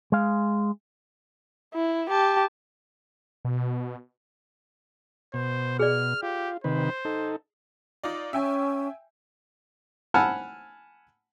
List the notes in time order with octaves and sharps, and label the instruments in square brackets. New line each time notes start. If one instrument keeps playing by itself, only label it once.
[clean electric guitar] G#3 F5
[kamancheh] E4
G4 A5
[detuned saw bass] B2
[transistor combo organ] B2 [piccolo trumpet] C5
[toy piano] G#4 D5 [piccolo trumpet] F6
[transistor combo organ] F4 [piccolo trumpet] G4
[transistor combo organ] C3 D#3 B4 [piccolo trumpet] C5
[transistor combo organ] D#4 A4
[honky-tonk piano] D#4 F4 D5
[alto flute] C#4 [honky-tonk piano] E5 G5 G#5
[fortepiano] F#5 G#5 A5 B5 E6 F6